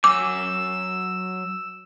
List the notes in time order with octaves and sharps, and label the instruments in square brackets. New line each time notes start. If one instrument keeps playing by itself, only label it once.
[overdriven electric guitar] F#3 G#5 [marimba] D6 [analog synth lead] E6